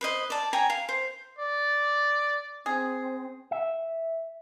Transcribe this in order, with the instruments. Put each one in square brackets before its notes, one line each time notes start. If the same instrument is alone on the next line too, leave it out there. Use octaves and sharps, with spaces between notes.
[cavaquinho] B4 C5 D#5
D5 A5
C#5 G5 G#5 A#5
F5
C5
[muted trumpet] D5
[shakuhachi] C4 [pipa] G#4
[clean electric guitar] E5